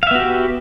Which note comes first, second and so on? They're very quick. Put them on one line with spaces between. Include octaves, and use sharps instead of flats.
F5 E5 B3 F#4 G4